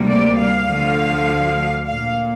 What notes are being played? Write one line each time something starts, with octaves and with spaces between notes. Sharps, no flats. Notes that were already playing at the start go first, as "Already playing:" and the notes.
Already playing: D2 C3 G3 A#3
D5
F5
D2 D3 F3
A#2 A#3 F5